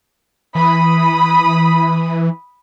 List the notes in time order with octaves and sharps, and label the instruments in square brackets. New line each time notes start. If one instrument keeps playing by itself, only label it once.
[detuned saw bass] E3 [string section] B5 D#6